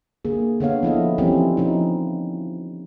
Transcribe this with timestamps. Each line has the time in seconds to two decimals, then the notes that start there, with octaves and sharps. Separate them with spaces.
0.25 D3 A#3 G#4
0.60 D3 B3 C#5 F5
0.83 F3 E4 A4 D#5
1.18 E3 F3 G3 C4 C#4 E4
1.57 F3 D#4